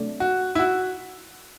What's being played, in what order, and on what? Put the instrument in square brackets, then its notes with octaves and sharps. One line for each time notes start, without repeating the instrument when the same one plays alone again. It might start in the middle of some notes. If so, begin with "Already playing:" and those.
Already playing: [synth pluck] C3 F#3 A3 D4
[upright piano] F#4
E4
F#4